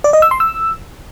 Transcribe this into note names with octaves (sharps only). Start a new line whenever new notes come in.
D5
D#5
E6
C6
E6